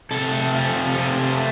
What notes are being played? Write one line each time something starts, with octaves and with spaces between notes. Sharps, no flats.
C3 A4
A3
F3
C3
C3
A3